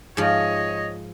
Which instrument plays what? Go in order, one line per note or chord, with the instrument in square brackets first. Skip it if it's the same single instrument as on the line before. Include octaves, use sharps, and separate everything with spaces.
[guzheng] G#2 F3 [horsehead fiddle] C#5 D#5